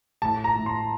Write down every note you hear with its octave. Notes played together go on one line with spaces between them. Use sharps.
A2 A5
A#5
A2
C6